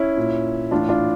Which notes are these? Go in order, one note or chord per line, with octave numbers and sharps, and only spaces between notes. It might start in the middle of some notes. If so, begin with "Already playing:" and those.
Already playing: C#4 E4
A#2
A2 E3 D4 F4
D4 F4